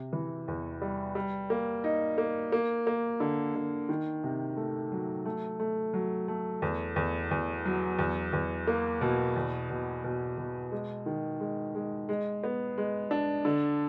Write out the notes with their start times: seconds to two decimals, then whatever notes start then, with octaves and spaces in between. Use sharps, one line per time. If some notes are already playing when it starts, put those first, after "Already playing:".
Already playing: C3
0.13 E3
0.48 E2
0.82 G3
1.15 G3
1.50 A#3
1.84 D#4
2.18 A#3
2.52 A#3
2.87 A#3
3.20 D3
3.55 D3
3.89 D#3
4.24 C3
4.57 A3
4.92 F#3
5.25 A3
5.60 A3
5.94 F#3
6.28 A3
6.62 E2
6.96 E2
7.31 E2
7.65 F#3
7.99 E2
8.33 E2
8.67 A#3
9.01 B2
9.36 E2
9.70 B2
10.04 B2
10.38 B2
10.72 G#3
11.06 D#3
11.40 G#3
11.75 G#3
12.09 G#3
12.44 B3
12.78 G#3
13.11 D4
13.45 D3